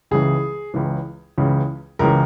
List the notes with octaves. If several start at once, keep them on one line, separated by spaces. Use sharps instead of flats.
C#2 C#3 E3 G#4
C#2 C#3 E3
C#2 C#3 E3
C#2 C#3 E3 A#4